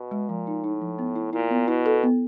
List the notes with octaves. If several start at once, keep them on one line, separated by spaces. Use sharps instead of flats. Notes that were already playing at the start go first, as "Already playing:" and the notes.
Already playing: B2
G#3
A#2 F3
D#4
A2 D#4
F3
B3
E4
A#2 E4
B3
B2 E4
A4
B3